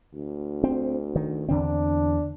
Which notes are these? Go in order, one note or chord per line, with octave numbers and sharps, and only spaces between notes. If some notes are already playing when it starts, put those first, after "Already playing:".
D2
C4
D#3
E2 D3 C4 D4